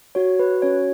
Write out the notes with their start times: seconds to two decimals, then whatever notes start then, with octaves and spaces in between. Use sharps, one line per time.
0.15 F#4 C#5
0.39 B4
0.62 C#4 C#5